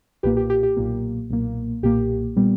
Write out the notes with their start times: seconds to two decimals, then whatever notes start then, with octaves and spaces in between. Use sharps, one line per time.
0.23 B1 A#2 A#3 G4 B4
0.37 G4
0.50 G4
0.63 G4
0.77 B1 A#2 A#3
1.30 B1 A#2 A#3
1.83 B1 A#2 A#3 G4
2.37 A#2 G3 B3